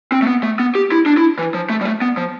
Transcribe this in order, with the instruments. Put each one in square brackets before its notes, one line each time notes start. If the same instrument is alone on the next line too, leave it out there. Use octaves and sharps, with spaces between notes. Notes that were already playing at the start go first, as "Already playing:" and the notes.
[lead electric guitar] C4
A3
B3
A3
B3
G4
E4
D4
E4
E3
F3
A3
G3
A3
B3
F3